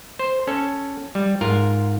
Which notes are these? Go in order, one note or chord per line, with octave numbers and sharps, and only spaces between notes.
C5
C#4 A4
G3
G#2 F4 A#4